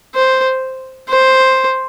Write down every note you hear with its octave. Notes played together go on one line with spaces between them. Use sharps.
C5
C5